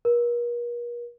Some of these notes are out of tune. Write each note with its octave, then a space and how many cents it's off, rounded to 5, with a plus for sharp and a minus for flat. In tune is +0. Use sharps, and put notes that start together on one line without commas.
A#4 +45